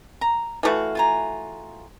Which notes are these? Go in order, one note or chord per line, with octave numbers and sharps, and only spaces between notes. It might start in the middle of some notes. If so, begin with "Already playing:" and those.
A#5
E3 A3 F#4 F5 F#5
F4 G#5 A#5